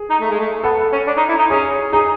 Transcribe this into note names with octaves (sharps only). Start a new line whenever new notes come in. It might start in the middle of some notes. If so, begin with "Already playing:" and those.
Already playing: G#4
D#4
A3
G#3
A3
B3 A4
C#4
D4
D#4
E4
D#4
C#4 G#4
D#4 G#4